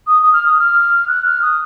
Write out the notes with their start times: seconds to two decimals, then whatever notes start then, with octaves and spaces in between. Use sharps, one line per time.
0.07 D#6
0.23 D#6
0.33 F6
0.45 D#6
0.58 F6
1.08 F#6
1.25 F6
1.42 D#6